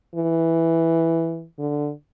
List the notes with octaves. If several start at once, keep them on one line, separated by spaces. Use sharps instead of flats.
E3
D3